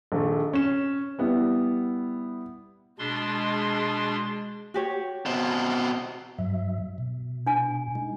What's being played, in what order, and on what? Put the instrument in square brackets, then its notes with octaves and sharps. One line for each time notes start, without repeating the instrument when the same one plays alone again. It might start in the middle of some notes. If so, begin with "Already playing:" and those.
[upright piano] A#1 D#3 A4
C#4 E7
G3 B3 E4
[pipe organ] B2 D4 C6 [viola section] G#3
[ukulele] F#4 G4 C#5
[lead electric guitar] B2 C4
[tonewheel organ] G2 F#3 E5
B2
[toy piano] D4 G#5
[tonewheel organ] G#3 D#4